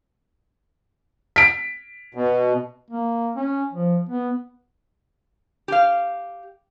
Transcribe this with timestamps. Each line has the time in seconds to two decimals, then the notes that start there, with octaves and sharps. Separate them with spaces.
1.36 B6 D7
2.15 B2
2.90 A#3
3.36 C#4
3.73 F3
4.09 B3
5.68 G4 F5